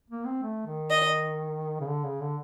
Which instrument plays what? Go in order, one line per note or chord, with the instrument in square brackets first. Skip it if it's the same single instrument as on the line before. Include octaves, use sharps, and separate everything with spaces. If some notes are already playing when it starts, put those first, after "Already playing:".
[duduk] A#3
C4
A3
D#3
[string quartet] D#5
[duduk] C#3
D3
C#3
D3